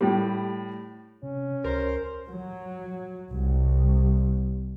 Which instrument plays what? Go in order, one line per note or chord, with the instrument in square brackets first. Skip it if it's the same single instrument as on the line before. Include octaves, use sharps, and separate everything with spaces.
[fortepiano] A2 G3
[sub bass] C3 [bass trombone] C#4
[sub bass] C#2 [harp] A#4 [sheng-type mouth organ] C5
[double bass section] F#3
C2